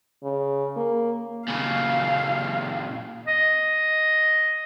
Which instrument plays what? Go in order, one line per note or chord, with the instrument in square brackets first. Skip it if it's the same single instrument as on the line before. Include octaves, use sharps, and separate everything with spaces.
[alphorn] C#3
A#3
[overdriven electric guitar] A#2 C#3 [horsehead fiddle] F5
[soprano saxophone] D#5